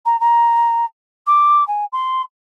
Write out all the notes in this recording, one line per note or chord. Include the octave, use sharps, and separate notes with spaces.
A#5
A#5
D6
G#5
C6